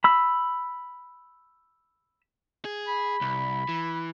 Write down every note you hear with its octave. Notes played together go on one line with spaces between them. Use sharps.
B5 E6
G#4
B5
C2
E3